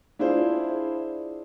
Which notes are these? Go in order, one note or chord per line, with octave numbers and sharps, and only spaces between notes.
D4 E4 F4 G#4 C5